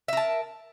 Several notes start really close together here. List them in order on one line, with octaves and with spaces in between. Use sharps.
E5 A#4 A5